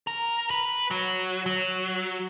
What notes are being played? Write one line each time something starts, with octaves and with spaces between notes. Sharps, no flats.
A#4
B4
F#3
F#3